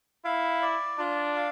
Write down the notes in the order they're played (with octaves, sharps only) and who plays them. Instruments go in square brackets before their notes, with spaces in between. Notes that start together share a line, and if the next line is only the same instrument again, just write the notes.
[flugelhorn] E4 [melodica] F5
[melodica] D5
[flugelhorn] D4 [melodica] F4
[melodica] F5